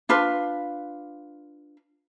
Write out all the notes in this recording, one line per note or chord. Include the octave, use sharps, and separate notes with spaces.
D4 F4 B4